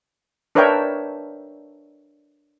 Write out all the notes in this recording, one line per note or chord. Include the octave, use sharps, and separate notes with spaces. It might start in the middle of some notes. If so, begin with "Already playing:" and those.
D4 A#4 B4 C#5 E5 G5